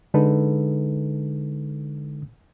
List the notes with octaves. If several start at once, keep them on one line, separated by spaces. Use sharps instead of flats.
D3 G#3 D#4 A4 B4